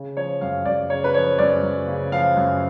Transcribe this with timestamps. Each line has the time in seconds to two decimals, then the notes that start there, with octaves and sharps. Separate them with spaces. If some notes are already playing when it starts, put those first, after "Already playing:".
Already playing: C#3
0.17 F3 C#5
0.41 F#2 F5
0.65 F#2 D5
0.90 C#3 C#5
1.04 B4
1.14 F3 C#5
1.39 F#2 D5
1.63 F#2
1.87 C#3
2.12 F3 F5
2.37 F#2